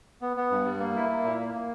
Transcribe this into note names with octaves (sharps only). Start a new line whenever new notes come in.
B3
B3
G2
G3
A#3
E4
A#3
A#2
A#3
A#3